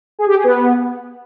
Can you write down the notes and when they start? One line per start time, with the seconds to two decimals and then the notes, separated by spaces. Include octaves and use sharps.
0.19 G#4
0.27 G4
0.35 G#4
0.44 B3